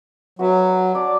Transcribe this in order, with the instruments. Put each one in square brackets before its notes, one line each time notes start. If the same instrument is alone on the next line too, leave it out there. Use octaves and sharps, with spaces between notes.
[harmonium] F#3 [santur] F#4 B4 E5
[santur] D5 E5 A5